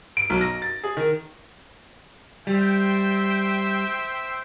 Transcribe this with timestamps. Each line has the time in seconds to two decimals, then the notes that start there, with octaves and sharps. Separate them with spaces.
0.17 D7
0.30 B1
0.41 A#6
0.62 A6
0.84 G#4
0.97 D#3
2.47 G3 C5 E5 G5